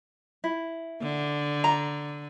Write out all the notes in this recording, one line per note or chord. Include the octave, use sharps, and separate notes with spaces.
E4
D3
A#5